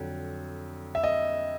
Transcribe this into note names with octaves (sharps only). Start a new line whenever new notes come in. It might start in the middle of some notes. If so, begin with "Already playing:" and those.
Already playing: F2 D3 F#3
E5
D#5